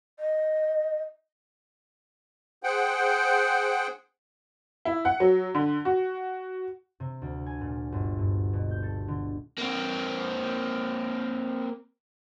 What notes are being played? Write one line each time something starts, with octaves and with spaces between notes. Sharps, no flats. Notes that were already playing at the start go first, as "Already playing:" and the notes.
D#5
G#4 C5 F#5 G5
E4
F#5
F#3
D3
F#4
C3
D2
G#5
A#2
G1
G2
B2
G6
A4
D3
A#3 C4